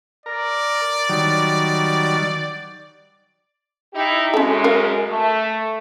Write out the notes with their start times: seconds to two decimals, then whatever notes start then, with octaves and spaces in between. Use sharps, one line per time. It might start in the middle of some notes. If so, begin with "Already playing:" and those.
0.26 A#4 D5
1.09 D#3 F#3 G3
3.93 D#4 E4 G4
4.34 F#2 G#3 C#4 A4
4.64 A#4 F5
5.09 A3